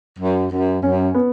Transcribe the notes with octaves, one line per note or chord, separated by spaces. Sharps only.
F#2
F#2
F#2 C#4
B3